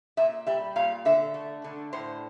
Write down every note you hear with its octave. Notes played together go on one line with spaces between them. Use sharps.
A#2 E5
G3 E5
A#2 F5
D3 E5
A3
D3
A2 C5